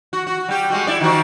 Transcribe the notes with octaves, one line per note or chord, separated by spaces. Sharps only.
F#4
F#4
G3 G4
G3 G#3 F#4
E4 D5
D#3 F3 F#4